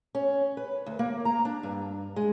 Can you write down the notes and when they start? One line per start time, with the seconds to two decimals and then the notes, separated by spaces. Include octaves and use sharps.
0.15 C#4
0.57 B4
0.86 D2
0.99 A#3
1.25 A#5
1.45 D4
1.63 G2
2.16 G#3